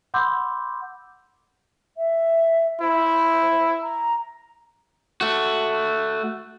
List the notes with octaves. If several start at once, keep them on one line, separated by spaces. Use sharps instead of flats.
F#5 B5 C6 D6 E6 G6
E5
E4 C5
A#5
A3 F#4